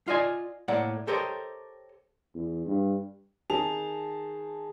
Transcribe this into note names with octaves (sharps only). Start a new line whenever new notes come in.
F4 D5 D#5 G#5
A2 A#3 D5 F#5
G4 A4 A#4 C5 C#5 D#5
E2
G2
D#3 G#4 A5 F7